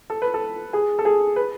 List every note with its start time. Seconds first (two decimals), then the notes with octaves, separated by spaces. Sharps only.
0.10 A4
0.22 B4
0.34 A4
0.73 G#4
0.99 A4
1.05 G#4
1.36 B4